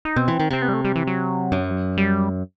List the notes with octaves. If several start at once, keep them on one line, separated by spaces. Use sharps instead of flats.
D#4
B2 C4
E3
D#3
C3 C4
B3
G3
A3
G3
E3
F#3
F#2
G3